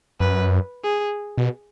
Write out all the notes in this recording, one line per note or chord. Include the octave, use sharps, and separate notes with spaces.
F#2 B4
G#4
B2